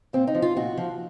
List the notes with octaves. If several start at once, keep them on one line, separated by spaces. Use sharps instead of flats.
A#2 C4
D#4
F3
F4
A#2 F#4
F3